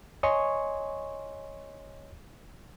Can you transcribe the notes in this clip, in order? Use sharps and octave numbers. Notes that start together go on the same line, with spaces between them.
C#5 D#5 G#5 C6 C#6